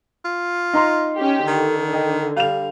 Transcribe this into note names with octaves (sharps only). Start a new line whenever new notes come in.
F4
D#4 A#5 C6
C#4 G4
D3 D#3
D#5 G5
G3 F5 F7